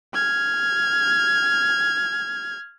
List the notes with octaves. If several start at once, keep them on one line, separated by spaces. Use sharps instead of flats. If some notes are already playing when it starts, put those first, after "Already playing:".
F6 G#6